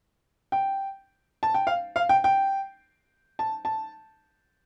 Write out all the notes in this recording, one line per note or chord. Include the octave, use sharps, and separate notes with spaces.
G5
A5
G5
F5
F5
G5
G5
A5
A5